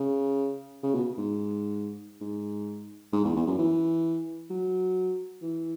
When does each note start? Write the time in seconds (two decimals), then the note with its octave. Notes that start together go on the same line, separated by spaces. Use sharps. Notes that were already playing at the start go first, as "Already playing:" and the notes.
Already playing: C#3
0.83 C#3
0.95 B2
1.18 G#2
2.21 G#2
3.13 G#2
3.24 E2
3.36 E2
3.47 F#2
3.59 E3
4.50 F#3
5.42 E3